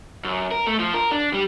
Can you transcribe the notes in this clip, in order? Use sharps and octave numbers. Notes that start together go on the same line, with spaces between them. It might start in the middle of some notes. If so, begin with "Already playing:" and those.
F#2
A#4
A3
F3
A#4
D4
G3